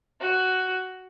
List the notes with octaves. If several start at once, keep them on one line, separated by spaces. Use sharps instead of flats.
F#4